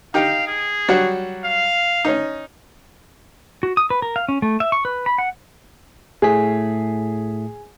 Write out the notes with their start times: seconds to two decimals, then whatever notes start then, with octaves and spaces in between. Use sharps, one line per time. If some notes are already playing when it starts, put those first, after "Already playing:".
0.14 D#4 G4 F5
0.48 G#4
0.89 F#3 G3 F#4
1.44 F5
2.05 C#4 D#4
3.63 F#4
3.77 D#6
3.90 B4
4.02 A#4
4.16 F5
4.28 C#4
4.42 A3
4.60 E5
4.72 C#6
4.85 B4
5.06 B5
5.18 F#5
6.22 A2 A3 G#4 B6